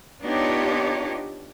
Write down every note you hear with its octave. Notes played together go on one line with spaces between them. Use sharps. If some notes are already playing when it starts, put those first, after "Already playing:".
B3 D4 D#4 F4 G4 C#5